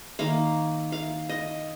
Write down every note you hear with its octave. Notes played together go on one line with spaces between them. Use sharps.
D#3 A#3 F5
F5
D#5